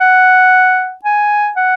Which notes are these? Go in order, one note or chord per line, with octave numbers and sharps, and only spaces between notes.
F#5
G#5
F#5